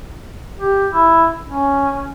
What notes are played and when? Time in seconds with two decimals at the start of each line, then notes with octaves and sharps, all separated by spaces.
0.59 G4
0.92 E4
1.48 C#4